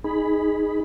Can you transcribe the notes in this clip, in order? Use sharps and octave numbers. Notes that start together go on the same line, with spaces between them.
D#4 G#4 B5